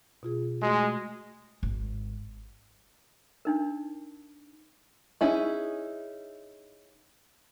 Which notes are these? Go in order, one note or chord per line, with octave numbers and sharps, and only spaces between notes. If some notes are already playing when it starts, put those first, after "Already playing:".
B2 F4 G#4
G#3 A3 F#4
G#1
D4 D#4 A#4
C#4 D#4 E4 G#4